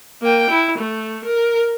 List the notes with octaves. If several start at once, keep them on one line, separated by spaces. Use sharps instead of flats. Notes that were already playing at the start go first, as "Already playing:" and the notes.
A#3 G5
E4
A3
A#4